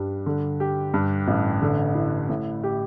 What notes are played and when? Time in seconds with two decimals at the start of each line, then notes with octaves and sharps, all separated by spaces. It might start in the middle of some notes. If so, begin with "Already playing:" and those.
Already playing: G2 G3
0.26 D3
0.60 G4
0.94 G2
1.28 A1
1.62 D3
1.95 E4
2.29 A2
2.64 G4